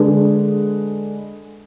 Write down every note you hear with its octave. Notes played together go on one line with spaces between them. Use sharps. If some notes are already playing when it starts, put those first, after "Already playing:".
Already playing: D3 G#3 D4 G#4 B4